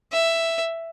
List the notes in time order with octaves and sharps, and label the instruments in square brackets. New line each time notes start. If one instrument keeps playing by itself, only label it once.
[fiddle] E5